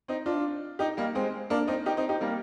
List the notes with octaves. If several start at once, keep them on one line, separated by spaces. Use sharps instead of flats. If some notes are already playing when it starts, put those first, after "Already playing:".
C4 D#4
D4 F4
D#4 G4
G3 A#3
G#3 C4
A#3 D4
C4 D#4
D#4 G4
C4 D#4
D#4 G4
G3 A#3